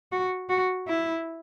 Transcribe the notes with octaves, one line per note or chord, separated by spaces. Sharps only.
F#4
F#4
E4